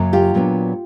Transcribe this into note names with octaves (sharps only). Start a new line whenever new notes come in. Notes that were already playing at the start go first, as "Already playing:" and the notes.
Already playing: F#2 C#3 F#3 A#3
F4 G4
A#2 F#3 B3 D4